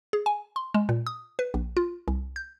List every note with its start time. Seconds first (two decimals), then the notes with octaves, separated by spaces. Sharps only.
0.13 G#4
0.26 G#5
0.56 C6
0.74 G#3
0.89 A#2
1.07 D#6
1.39 B4
1.54 A#1
1.77 F4
2.08 C2
2.36 G6